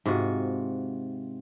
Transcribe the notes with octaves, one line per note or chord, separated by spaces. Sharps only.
G#2 C3 F4 F#4